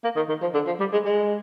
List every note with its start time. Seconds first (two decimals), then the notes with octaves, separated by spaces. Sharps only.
0.04 A#3
0.16 D#3
0.29 D#3
0.42 F3
0.54 D3
0.67 F3
0.79 G3
0.93 G#3
1.05 G#3